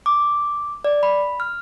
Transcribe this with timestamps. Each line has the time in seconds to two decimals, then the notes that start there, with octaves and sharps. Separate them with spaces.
0.06 D6
0.85 D5
1.03 B5
1.40 F6